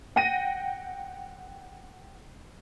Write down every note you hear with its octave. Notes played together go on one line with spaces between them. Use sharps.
F#5 G5 A#6 D#7